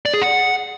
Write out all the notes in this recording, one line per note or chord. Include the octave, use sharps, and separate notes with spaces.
D5
G#4
F#5